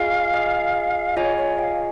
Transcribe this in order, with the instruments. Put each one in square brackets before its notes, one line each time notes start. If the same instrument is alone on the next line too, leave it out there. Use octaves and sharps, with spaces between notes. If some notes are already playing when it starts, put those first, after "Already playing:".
Already playing: [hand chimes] F4 G#4 D#5 G#5 [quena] F5
[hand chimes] F4 G#4 D#5 G#5
[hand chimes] F4 G#4 D#5 G#5 [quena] C#5
[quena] C#5
G5
F5